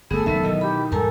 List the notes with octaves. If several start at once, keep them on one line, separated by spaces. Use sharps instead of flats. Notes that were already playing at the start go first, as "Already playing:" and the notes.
G1 A3 B3 G#4 A4
F1 C#2 A#2 D#3 F#3 B3 E5
B2 E3 D#5
G4 B5
E2 G#2 G3 A4 A#4 G#5 A#5